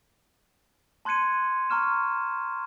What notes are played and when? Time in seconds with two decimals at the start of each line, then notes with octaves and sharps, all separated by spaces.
1.05 A5 C6 F#6 G#6 C#7 D#7
1.70 A#5 C#6 F6 E7